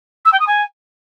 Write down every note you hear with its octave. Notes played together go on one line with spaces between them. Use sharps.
E6
G5
D#6
G#5